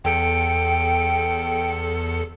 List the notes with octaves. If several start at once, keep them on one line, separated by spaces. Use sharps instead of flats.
E2 A4 G5 C#7